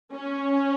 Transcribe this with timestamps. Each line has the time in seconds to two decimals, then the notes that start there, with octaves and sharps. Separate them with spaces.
0.15 C#4